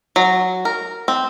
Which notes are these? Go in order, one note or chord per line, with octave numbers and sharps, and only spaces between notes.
F#3
A#4
C4